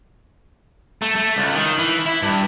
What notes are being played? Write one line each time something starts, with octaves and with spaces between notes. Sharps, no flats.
A3
A3
C#2
D#3
E3
E4
G2